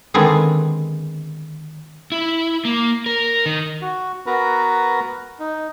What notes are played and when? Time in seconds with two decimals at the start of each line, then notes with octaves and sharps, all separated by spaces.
0.14 D3 D#3 G#3 B3 C4
2.12 E4
2.65 A#3
3.06 A#4
3.46 D#3
3.82 F#4
4.26 B3 F#4 A#4 B4 A#5
5.40 D#4